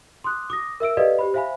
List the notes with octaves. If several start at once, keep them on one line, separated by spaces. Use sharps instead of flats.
C6 D6 D#6 F#6
D6 D#6 A#6
A#4 E5 E6 D7
G4 A4 B4 D5 D#5 F5
G4 C5 B5
C5 E5 F5 G#5 B5